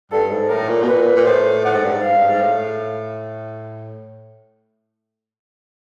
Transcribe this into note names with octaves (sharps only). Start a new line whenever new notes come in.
G2 A4
G#2
A2 A#4
A#2
B2
A#2 B4
A#2
A2 C5
A2 F#5
G#2
G2
G#2
F5
G2
G#2
A2